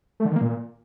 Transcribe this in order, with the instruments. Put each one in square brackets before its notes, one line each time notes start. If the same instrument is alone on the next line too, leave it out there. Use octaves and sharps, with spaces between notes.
[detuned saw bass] A3
D3
D#3
A#3
A#2